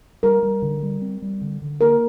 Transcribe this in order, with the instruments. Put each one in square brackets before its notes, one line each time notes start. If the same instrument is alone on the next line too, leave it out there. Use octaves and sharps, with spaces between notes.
[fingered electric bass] G3 [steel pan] A#4
[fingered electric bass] G3
D3
G3
C4
G3
D3
D3
[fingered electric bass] A#3 [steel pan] A#4